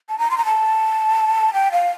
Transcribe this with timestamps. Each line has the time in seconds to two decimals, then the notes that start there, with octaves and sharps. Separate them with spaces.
0.09 A5
0.19 A#5
0.31 C6
0.38 A#5
0.45 A5
1.54 G5
1.72 F5